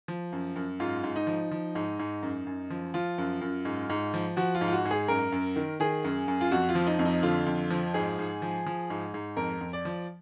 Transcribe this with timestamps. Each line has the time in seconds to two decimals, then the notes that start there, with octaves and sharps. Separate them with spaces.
0.08 F3
0.32 F#2
0.56 F#2
0.80 G#2 F4
1.04 G#2
1.16 D#4
1.27 F3
1.51 F3
1.75 G#2
1.99 G#2
2.23 F#2
2.47 F#2
2.70 F3
2.94 F3 F4
3.18 F#2
3.41 F#2
3.65 G#2
3.90 G#2
4.14 F3
4.37 F3 F#4
4.55 F4
4.61 G#2
4.68 F4
4.73 F#4
4.85 G#2
4.91 G#4
5.08 F#2 A#4
5.32 F#2
5.56 D#3
5.80 D#3 G#4
6.04 F#2
6.28 F#2
6.41 F4
6.51 F2 F#4
6.69 F4
6.75 F3
6.87 D#4
6.99 F2
7.05 D#4
7.23 D3 F4
7.46 F2
7.70 F3
7.94 G#2 G#4
8.19 G#2
8.42 F3
8.66 F3
8.90 G#2
9.14 G#2
9.37 F2 A#4
9.61 F2
9.73 D5
9.85 F3